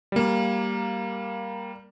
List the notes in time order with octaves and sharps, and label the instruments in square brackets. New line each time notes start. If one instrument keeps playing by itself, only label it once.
[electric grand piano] G3 A#3